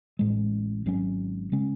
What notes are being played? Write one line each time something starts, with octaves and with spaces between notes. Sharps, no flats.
A1 A2 G#3
G#1 G#2 F#3 C#4
C#3 G#3 C#4